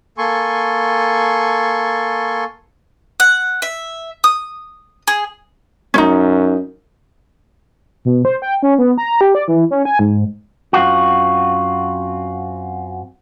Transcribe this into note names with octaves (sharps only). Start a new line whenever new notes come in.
A#3 A4 G#5 C6 C#6
F#5
E5
D#6
G#4
F#2 C#4 D#4
B2
C5
G5
C#4
B3
A#5
G4
D5
E3
C#4
G#5
G#2
F#2 C4 F4 F#4